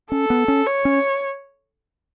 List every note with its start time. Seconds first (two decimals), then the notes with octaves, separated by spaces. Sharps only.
0.12 C#4 A4
0.30 B3
0.48 C#4
0.67 C#5
0.85 C#4